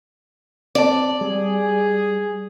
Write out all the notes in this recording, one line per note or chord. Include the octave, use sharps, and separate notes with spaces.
C4 D5 A5
G3 G#4